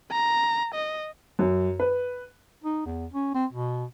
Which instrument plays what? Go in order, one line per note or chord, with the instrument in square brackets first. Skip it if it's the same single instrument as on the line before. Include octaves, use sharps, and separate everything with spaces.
[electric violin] A#5
D#5
[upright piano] F#2
B4
[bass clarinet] D#4
E2
C#4
C4
B2